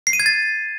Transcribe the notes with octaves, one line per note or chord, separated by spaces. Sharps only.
C7
D#7
G#6
A6